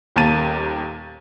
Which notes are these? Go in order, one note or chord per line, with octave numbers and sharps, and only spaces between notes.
D#1 D#2 A#3 A5 A6 D#7